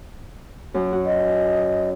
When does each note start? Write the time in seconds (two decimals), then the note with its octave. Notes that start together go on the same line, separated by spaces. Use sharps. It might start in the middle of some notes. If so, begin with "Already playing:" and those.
0.74 F#2
0.93 F#4
1.06 D#5